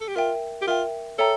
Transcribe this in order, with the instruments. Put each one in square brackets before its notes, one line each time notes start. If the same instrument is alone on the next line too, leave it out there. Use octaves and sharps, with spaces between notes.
[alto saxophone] A4
G4
[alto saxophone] F4 [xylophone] A#4 E5 G5
[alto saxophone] G4
[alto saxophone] F4 [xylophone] A#4 E5 G5
[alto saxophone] A4 [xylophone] C#5 E5 G5 A#5